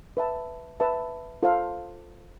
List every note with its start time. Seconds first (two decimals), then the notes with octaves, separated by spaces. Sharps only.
0.17 B4 E5 A5
0.80 B4 E5 A5
1.43 F4 A4 C5 F5